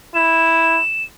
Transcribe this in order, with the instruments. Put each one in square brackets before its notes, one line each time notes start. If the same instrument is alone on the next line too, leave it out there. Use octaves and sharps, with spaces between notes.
[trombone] E4 [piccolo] E7